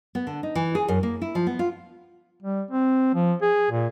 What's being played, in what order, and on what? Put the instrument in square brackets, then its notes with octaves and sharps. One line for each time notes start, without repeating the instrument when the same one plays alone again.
[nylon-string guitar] B3
D3
D#4
E3
G#4
F#2
A#3
E4
F3
B3
F4
[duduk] G3
C4
F3
G#4
A#2